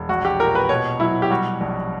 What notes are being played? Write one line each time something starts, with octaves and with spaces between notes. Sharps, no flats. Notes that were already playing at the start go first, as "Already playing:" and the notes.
Already playing: E1
A#1 F#4
G4
A#2 A#4
B4
B2 C#5
F#3 E4
G4
G3 F#4
A#1